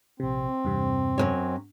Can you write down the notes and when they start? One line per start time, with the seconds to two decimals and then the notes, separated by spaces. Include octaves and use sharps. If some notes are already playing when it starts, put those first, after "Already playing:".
0.20 A#1 C3 C4
0.64 E2 G2 C3
1.18 F#2 A#2 C#5